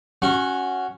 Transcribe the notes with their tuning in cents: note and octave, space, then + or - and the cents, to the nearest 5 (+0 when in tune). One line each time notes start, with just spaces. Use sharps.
C#4 +0 F#4 +0 C#6 -35